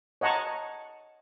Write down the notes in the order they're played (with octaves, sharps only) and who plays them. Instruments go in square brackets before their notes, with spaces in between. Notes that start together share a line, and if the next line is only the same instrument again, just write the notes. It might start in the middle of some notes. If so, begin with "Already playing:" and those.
[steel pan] C#5 D#5 F#5 A5 A#5 C#6